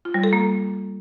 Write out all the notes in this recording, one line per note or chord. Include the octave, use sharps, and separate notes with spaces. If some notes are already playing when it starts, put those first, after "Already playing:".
F4
G3
A4
A#3